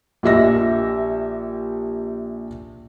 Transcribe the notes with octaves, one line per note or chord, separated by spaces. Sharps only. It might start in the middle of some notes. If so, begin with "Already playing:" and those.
A#1 G4 E5 A#6